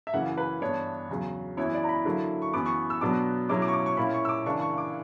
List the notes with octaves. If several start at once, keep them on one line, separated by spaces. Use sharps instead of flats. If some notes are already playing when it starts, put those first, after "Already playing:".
E5
F#2 C#3 E3 A#3 F#5
B4
G2 E3 B3 D4 C#5
E2 C#3 F#3
F#2 E3 B3 E4 C#5
D5
A#5
B5
D3 F#3 A#3 E4
C#6
F#2 E3 B3 D6
C#6
E6
B2 F#3 B3 D4 D6
B2 F#3 C#4 E4 D6
D6
C#6
D6
C#6
A#2 A#3 C#4 E4 B5
C#6
E6
D6
C#3 E3 A#3 D4 C#6
C#6
D6